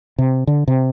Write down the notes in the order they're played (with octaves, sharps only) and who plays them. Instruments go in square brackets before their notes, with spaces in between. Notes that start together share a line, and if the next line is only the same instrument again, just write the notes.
[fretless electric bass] C3
D3
C3